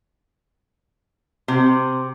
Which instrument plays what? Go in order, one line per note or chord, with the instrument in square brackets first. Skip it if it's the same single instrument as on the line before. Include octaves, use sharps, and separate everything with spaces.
[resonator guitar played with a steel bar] C3